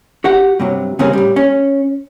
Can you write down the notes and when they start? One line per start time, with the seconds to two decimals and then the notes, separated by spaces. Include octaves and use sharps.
0.24 F#4 G4 F#5
0.60 G2 C3 F#3
0.99 C#3 G3 C4 C#4 G#4 A#4
1.13 A2 G3
1.36 C#4